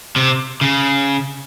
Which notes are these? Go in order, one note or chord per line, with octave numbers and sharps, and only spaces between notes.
C3
C#3